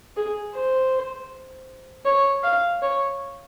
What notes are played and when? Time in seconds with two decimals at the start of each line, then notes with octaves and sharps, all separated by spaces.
0.16 G#4
0.54 C5
2.06 C#5
2.43 F5
2.82 C#5